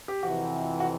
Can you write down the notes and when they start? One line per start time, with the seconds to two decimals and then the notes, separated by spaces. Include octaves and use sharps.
0.08 G4
0.23 F2 C3 E3 F#4
0.80 F#4